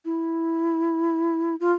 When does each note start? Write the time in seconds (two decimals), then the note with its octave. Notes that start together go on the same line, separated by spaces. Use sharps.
0.05 E4
1.60 F4